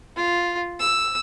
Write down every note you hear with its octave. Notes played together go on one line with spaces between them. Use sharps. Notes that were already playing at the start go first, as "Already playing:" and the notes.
F4
E6